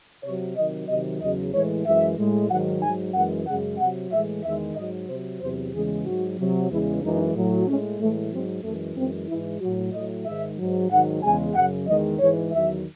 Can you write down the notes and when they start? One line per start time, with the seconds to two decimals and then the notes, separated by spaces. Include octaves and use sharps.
0.24 C3 F#3 C#5
0.56 C3 D#3 F#3 D#5
0.88 C3 D#3 F#3 D#5
1.21 E2 C#3 F#3 D#5
1.54 A2 E3 G#3 C#5
1.86 F#2 E3 G#3 E5
2.18 A2 G#3
2.50 G#2 D#3 F#3 F#5
2.83 G#2 F#3 G#5
3.15 F#2 E3 G#3 F#5
3.47 F#2 C#3 G#3 F#5
3.79 C3 F#3 F#5
4.11 A2 E3 G#3 E5
4.44 E2 D#3 G#3 E5
4.76 G#2 F#3 D#5
5.09 C3 F#3 C5
5.41 E2 C3 F#3 C5
5.74 E2 C#3 E3 G#3 G#4
6.05 G#2 F#3 F#4
6.38 C3 F#3
6.70 E2 C#3 E3 G#3 E4
7.03 F#2 E3 G#3 D#4
7.36 A2 F#3
7.67 A2 G#3 C#4
8.00 A2 E3 G#3 A3
8.32 G#2 F#3 C4
8.64 F#2 E3 G#3 A3
8.96 F#2 E3 G#3 C4
9.28 G#2 E3 G#3 E4
9.61 A2 F#3 F#4
9.93 A2 F#3 D#5
10.25 G#2 D#3 G#3 E5
10.59 G#2 F#3
10.90 G#2 D#3 F#3 F#5
11.23 E2 C#3 G#3 G#5
11.55 F#2 C#3 F#3 F#5
11.87 E2 D#3 G#3 D#5
12.19 G#2 E3 G#3 C#5
12.52 E2 D#3 F#3 E5